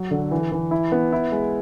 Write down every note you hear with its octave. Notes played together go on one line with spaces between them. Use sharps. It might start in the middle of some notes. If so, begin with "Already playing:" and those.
Already playing: F#3
D3
E3
E3
E4
B3
E4
G#3